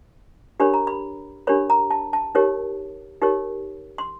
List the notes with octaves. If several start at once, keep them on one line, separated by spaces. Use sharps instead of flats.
D4 G4 A#4 C#5 B5
A#5
B5
D4 G4 A#4 C#5 B5
A#5
A5
A5
D#4 G4 A#4 C#5
D#4 G4 A#4 C#5
C6